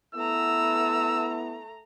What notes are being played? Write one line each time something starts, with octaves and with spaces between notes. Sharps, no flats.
A3 B3 E4 A#5 E6